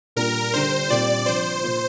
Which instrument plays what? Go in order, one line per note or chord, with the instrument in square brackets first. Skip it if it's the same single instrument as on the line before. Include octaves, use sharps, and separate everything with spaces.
[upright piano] A#2 G3 A#3 D4 F4 [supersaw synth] A#4
[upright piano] D3 G3 D4 [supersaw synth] C5
[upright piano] A#2 G3 C4 F4 [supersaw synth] D5
[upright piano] C3 F3 D4 F4 [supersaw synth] C5
[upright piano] A#2 A#3 F4